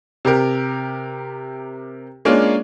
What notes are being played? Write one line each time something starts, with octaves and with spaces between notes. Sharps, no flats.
C3 G4 A#4
G#3 A#3 C#4 D4 F4